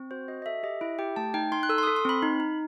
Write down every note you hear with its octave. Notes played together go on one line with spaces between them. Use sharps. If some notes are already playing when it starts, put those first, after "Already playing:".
Already playing: C4
F#4 C5
F#4 D#5
D#5
A4 E5
G4 D#5
E4 E5
G4 G5
A3 A5
D#4 G5
D#4 C6
F#6
A4 E6
C6
A4 D#6
C6
C4 B5
D#4
D#4